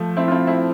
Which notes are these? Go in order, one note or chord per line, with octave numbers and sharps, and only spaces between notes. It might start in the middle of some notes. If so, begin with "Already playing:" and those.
Already playing: F3 A3
C4 E4
F4
C4 E4
C4 E4